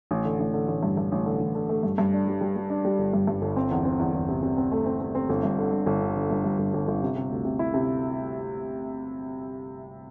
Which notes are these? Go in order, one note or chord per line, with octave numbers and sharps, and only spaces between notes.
A1
D3
A1
D3
A1
G2
G2
A1
D3
A1
D3
A3
G2
G2
D4
G3
G3
G3
D4
G3
G1
G2
G2
G1
C4
E2
C4
E2
E2
C3
C3
C4
A3
C4
C4
C4
G1
G2
D3
G1
G1
D3
D3
G2
G2
G1
G1
G1
C3
C3
D2
C3
E4
C3